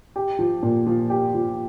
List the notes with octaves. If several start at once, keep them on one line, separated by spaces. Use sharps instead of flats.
G4
F3
A#2
F3
G4
F3